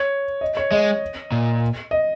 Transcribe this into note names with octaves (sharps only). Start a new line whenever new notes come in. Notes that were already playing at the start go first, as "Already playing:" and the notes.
Already playing: C#5
D#5
C#5
G#3 D#5
A#2
D#5